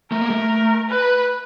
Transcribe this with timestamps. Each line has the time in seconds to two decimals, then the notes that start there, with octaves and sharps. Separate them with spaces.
0.12 A3 A#4
0.21 A#3
0.30 A3
0.89 B4